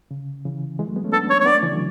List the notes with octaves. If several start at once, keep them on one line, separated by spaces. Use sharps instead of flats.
C#3
C#3 E3
E3 G#3
F#3 A3
G#3 B3
A3 C#4
B3 D4 A4
C#5
C#5
B3 D4 D5
A3 C#4
C#3 E3
D3 F#3